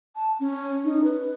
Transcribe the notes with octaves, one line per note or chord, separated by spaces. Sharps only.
A5
C#4
D#4
B4